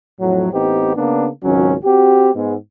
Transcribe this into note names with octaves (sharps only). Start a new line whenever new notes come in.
F2 A2 F#3
A1 B3 C4 D#4 G4
C#3 A#3 B3 D4
G#1 C#2 F#3 C#4
C4 F#4 G4
G#2 G#3 B3